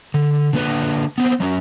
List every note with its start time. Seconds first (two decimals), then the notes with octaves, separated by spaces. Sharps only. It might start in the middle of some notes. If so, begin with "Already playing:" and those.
0.14 D3
0.53 D3 A#3 B4
1.18 B3 C4
1.40 F#3 C#4 A#4